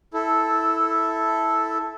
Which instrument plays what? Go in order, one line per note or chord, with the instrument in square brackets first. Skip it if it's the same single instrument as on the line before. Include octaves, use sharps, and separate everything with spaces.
[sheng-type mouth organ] E4 A4